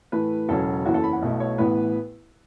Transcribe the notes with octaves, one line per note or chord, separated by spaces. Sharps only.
A2 E3 A3 B4
E1 E2 C#3 F#3 C#4 A4
F#1 E2 E3 C#4 F#4
A4
B5
F#5
B1 B2 A3 E4
C#5
A1 A2 E3 B3 B4